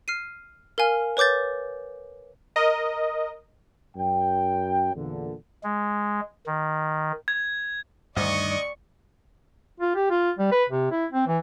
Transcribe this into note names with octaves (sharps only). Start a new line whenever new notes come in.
F6 C7 D#7
A#4 F5 G#5 F6
B4 C#5 D6 G6 A6
A#4 D#5
F#2 G5
E2 A#2 D3
G#3
D#3
G#6
D2 G2 D#3 D5 D#5 C#6
F4
G4
F4
G3
B4
C3
E4
C4
E3